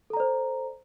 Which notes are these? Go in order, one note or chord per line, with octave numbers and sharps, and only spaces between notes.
A4 C5 D5 A#5